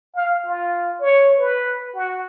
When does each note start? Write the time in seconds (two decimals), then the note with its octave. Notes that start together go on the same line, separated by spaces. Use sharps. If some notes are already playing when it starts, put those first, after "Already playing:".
0.15 F5
0.45 F4
1.01 C#5
1.39 B4
1.95 F#4